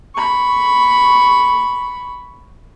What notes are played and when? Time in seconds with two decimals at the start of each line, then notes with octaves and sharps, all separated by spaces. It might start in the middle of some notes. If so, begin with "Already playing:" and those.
0.15 B5 C#6